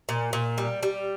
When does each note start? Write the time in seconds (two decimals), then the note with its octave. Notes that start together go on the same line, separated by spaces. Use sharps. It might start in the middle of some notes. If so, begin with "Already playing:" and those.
0.09 A#2
0.33 A#2
0.58 G3
0.83 G3